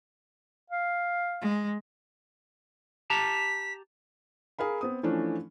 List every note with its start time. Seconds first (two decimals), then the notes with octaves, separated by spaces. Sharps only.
0.70 F5
1.41 G#3
3.10 G4 A5 A#5 B6
4.59 G#4 A#4 F5 B5
4.81 B3 C4 D#6
5.03 E3 F3 A3 C#4 D4